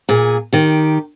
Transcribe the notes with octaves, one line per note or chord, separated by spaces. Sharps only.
A#2 G#4
D#3 G4